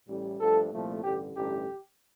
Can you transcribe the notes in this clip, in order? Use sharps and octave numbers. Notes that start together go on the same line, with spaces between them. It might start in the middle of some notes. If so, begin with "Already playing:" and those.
A1 A2 G3
G2 F3 A3 A4
C2 A#2 F3 A3
A1 G2 D3 G4
A1 G2 D3 A3 G4